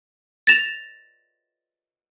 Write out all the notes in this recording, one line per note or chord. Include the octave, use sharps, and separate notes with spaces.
A6 A#6 E7 F7